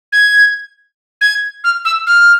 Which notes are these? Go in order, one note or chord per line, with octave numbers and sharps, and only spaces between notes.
G#6
G#6
F6
E6
F6